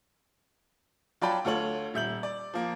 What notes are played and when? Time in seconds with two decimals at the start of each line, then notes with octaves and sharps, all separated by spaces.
1.21 F#3 F4 D5 G5 A5 B5
1.45 D2 F4 A4 C#5 F#7
1.94 D#1 E5 G6 F#7
2.23 D5
2.54 F3 A#3